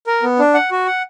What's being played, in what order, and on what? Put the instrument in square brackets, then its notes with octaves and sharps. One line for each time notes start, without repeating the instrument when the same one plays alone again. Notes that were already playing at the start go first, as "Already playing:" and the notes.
[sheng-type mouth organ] A#4
B3
D4
F#5
F#4
F#5